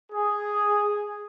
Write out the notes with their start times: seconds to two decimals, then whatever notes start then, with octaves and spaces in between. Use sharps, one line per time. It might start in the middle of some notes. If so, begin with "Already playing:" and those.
0.13 G#4